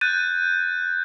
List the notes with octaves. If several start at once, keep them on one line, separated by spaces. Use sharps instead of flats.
F#6 G6 A6 D#7